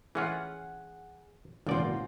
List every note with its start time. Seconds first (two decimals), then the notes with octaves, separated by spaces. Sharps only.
0.15 E3 C#4 F4 G#4 F#5
1.67 G#1 E2 A#2 C#3 F4 F#4 C5 D5